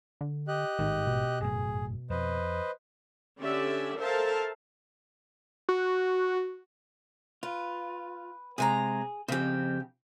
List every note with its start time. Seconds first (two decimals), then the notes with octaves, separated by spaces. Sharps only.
0.21 D3
0.48 G4 D#5 F#6
0.79 A1 G#2 D#3
1.07 B2
1.41 G1 F#2 A2 G#4
2.10 F2 B4 C5 D#5
3.39 D3 C#4 G4 D5 E5
3.98 A4 A#4 C5 E5 F5 A5
5.69 F#4
7.43 F4 B4
8.58 C3 G#3 G#4 A#5
9.28 F2 C#3 C4 G4 C5